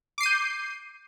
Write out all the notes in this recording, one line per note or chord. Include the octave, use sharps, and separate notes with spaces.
D6 G6 C7 D#7